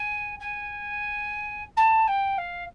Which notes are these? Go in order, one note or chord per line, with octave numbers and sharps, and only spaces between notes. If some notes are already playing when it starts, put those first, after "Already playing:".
Already playing: G#5
G#5
A5
G5
F5